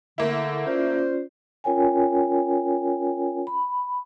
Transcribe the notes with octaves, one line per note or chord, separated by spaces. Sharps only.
D3 A3 A#3 E4
C#4 F4 C5 D5
C#4 F4 A#4 C#5 G5 G#5
B5